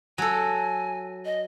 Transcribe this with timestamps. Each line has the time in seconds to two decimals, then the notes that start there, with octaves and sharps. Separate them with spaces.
0.18 F#3 A4 G#5
1.25 D#5